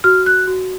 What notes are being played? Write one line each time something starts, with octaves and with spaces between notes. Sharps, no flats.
F#4 F6
F#6
F#4